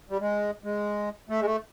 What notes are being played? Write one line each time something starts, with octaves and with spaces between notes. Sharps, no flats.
G3
G#3
G#3
A3
G#3
A3